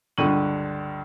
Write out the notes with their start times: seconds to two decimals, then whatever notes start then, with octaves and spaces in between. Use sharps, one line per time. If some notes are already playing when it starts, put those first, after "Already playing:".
0.18 C#2 G2 D3 C#6 D#7 F#7